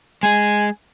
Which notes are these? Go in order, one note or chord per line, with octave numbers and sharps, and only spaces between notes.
G#3 G#4 G#5